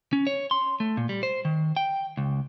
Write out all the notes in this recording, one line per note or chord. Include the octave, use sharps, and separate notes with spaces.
C#4
C#5
C6
A3
A#2
G3
C5
D#3
G5
C#2